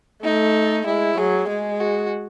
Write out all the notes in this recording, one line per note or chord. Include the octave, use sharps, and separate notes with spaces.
A3 D#4
G#3 E4
F#3 G#4
G#3 G#4
F#4